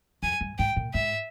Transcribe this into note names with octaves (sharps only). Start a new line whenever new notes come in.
F2 G#5
G2
G#2 G5
A#2
G#2 E5